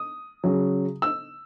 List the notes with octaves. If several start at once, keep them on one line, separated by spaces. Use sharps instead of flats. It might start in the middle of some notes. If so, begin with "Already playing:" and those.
Already playing: D#6
C#3 F#3
E6